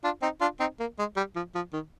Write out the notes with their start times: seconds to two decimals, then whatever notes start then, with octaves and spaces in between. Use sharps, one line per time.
0.04 D4 F4
0.22 C4 D#4
0.41 D4 F4
0.60 C4 D#4
0.80 A#3
0.99 G#3
1.17 G3
1.36 F3
1.55 F3
1.73 D#3